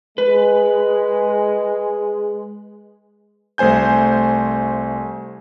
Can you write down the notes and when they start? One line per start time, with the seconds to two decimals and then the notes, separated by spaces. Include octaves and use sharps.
0.18 G#3 B4
3.58 C2 A3 C5 G#5 G6